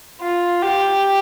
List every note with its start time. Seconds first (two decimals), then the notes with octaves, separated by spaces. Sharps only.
0.21 F4
0.62 G4